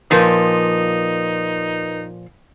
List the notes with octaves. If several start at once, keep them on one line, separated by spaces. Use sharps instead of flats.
A#2 F3 D#4 A#4 B4